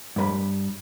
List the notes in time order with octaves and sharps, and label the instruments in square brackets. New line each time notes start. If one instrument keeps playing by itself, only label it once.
[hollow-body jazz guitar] G2 B4 B5